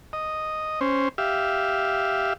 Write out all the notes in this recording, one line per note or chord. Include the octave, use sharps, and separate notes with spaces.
D#5
C#4 C5
G4 E5 F5